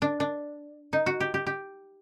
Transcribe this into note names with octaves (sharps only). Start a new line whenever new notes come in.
D4
D4
D#4
F#4
G4
G4
G4